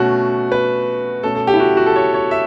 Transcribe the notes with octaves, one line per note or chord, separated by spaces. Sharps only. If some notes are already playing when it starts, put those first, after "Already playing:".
Already playing: B2 A3 C#4 F#4
B4
B2 A3 C#4 A4
A4
G4
E4
F#4
F#4
A4
C#5
C#5
E5